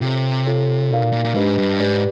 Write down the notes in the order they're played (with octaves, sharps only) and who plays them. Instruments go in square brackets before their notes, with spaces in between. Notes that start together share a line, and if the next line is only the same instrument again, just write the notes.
[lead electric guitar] C3 [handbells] F4 A4 C#5
[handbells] F4 A4 C#5
[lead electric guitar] B2 [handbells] D#4 F#4 A#4 D5 F5
[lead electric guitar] A#2
A#2
A#2
[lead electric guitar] G#2 [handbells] D4 G4 B4 D#5
[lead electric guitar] G2
[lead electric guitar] G#2 [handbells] G4 B4 D5